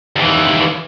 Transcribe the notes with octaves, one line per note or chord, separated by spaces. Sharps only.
D#2 E3